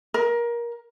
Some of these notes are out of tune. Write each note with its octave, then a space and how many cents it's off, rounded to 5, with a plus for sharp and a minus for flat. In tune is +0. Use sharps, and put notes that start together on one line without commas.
A#4 +20